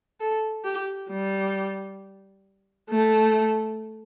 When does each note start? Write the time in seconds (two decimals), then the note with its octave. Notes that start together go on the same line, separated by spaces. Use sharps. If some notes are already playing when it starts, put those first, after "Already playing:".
0.20 A4
0.64 G4
1.10 G3
2.90 A3